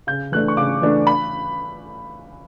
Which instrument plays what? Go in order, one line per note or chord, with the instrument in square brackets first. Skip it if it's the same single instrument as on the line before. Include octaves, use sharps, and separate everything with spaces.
[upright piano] C#3 G6
E3 A3 D4 F#6
C#6
C#3 D6
E3 A3 D4
B5